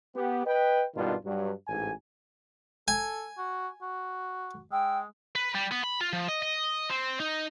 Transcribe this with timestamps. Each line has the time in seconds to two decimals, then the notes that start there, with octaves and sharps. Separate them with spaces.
0.15 B3 G4
0.45 B4 D#5 G5
0.95 G#1 G2 B2 D#3 D4 F4
1.24 G2 F#3
1.68 A1 G#2 G#5
2.88 A4 G#5
3.38 F#4
3.82 F#4
4.71 G#3 G5 E6
5.36 B4
5.55 G3
5.71 B3
5.83 B5
6.01 F4
6.13 F3
6.29 D#5
6.43 D#5
6.90 C4
7.20 D#4